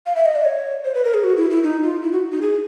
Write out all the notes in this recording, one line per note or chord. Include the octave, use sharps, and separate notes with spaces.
F5
E5
D#5
D5
C#5
C5
B4
A#4
G#4
F#4
E4
E4
D#4
F4
E4
F#4
D#4
G#4